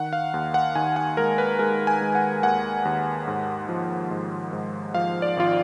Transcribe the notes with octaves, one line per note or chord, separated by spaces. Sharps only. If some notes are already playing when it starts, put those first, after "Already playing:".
Already playing: D#3 F#5
F5
D#2
F#5
D#3 G#5
F#5
G#3 A#4
B4
G#3 A#4
G#5
G#3
F#5
D#2 F#5
D#2
G#2
F3
G#2
G#2
F3 F5
D5
G#1 F4